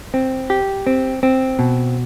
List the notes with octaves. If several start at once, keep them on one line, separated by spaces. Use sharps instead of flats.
C4
G4
C4
C4
B2